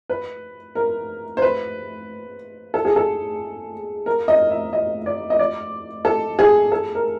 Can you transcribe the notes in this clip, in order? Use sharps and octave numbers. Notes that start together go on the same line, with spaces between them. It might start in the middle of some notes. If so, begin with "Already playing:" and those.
B4
A#4
C5
B4
A4
G#4
A4
A#4
D#5
E5
D#5
D5
D#5
D5
A4
G#4
A4
A#4